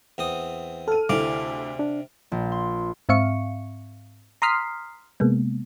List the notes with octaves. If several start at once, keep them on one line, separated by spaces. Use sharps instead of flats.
E2 C4 D#6
A4 F6 D#7
D2 C3 E4 D5 F5 D6
D4
A#1
C6
G#2 C4 E5 F5 C#6 C#7
A#5 C6 D#6 F6 B6 C7
C3 G#3 A#3 B3